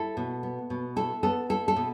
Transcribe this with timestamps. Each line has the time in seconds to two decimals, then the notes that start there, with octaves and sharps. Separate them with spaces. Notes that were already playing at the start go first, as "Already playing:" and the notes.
Already playing: E4 A4
0.17 B2
0.43 B3
0.70 B2
0.96 E4 A4
1.23 B3 A4
1.50 E4 A4
1.68 A4
1.76 B2